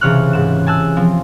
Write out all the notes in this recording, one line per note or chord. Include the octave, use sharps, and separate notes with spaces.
C#2 C3 E3 C#5 F6 F#6
G#2 F#6 E7
G#5 A5 E6 F#6
F3 C4